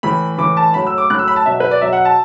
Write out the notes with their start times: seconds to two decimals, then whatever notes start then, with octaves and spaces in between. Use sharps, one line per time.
0.03 A2 E3 B5
0.38 A2 E3 D6
0.57 A5
0.74 A2 F#3 B5
0.87 E6
0.98 D6
1.10 A2 F#3 F#6
1.19 E6
1.28 B5
1.36 A5
1.45 B2 F#3 E5
1.60 B4
1.71 D5
1.81 B2 F#3 E5
1.93 F#5
2.05 A5